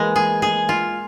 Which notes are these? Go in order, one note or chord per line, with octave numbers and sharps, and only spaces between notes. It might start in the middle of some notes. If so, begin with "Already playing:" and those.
Already playing: E3 G#3 A#3
G#4
G#4
F4